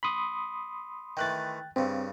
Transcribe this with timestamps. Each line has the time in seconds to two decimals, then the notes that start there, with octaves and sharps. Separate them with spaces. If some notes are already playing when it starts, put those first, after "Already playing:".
0.03 B5 C6 D#6
1.17 D#3 E3 A3 G5 F#6 A6
1.76 G2 C#3 C4